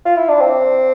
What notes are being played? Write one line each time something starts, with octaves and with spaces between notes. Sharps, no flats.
F4
E4
D4
C4